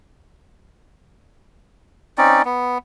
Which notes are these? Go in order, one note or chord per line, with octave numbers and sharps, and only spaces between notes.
C4 C#4 D#4 D5
B3